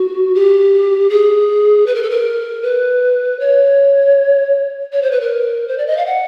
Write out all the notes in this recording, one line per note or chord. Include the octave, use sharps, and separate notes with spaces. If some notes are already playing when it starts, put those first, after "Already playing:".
Already playing: F#4
G4
G#4
B4
A#4
A4
A#4
B4
C#5
C#5
C5
B4
A#4
C5
D5
D#5
F5
F#5